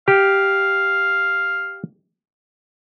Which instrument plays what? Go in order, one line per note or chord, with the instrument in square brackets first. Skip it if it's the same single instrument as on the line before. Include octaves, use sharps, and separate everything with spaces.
[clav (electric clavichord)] G4 [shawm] F5